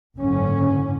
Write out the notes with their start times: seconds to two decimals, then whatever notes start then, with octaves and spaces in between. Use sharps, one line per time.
0.16 F#1 G#2 D3 C#4